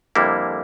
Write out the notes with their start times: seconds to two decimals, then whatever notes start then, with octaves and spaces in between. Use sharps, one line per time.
0.15 F2 D3 G3 A#3 E4